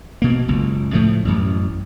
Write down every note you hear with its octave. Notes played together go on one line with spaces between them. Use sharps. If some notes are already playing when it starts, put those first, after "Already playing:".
B2 A#3
F#1 C#2
A2 F3 A3
A1 F#2